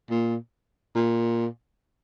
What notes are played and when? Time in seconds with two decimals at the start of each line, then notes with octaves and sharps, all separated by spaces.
0.10 A#2
0.96 A#2